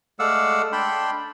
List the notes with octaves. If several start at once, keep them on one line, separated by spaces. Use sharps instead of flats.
G#3 A3 D5 F5 F#5 E6
D4 G5 B5 C6